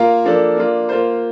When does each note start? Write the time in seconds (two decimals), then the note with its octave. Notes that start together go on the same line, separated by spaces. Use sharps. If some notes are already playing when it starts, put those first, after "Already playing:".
Already playing: A#3 F4 A#4 F5
0.24 F3 A#3 D4 A4
0.57 A#3 D4 F4
0.89 A#3 F4 C5